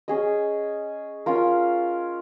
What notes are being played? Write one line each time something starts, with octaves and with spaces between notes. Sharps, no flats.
C#4 G#4 D#5
C#4 F4 A#4